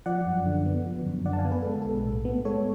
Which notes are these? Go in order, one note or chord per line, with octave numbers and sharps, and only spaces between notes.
F3 D5 F#5
F#2
D3
B3
F3
F#2
D3 D5 F#5
A5
F5 G#5
B3
B4
G#3 A4
B1 A4
A2
B3
G#3 A4 C#5